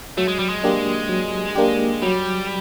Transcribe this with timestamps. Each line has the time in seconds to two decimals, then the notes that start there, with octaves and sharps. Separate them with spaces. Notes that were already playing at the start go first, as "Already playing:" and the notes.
0.18 F#3 A3
0.28 G#3
0.39 G3
0.49 G#3
0.64 A#3 D4 G4
1.09 F#3
1.55 A#3 D4 G4
2.02 F#3 G3